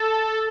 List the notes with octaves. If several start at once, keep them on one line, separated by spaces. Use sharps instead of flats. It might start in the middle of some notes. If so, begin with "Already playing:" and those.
Already playing: A4